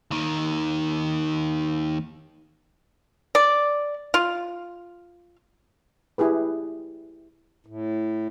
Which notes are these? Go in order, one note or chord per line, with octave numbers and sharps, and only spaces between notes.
D#2 D#3
D5
F4
E4 G4 G#4 B4
A2